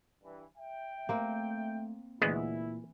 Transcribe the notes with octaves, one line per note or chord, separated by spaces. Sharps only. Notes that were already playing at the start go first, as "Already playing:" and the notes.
G2 E3
E5 G5
A3 A#3 C4 F#5
D2 A#2 E3 G#3 B3 E4